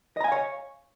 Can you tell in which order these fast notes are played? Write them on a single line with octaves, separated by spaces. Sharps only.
D#5 A#5 G#5 F5 C#5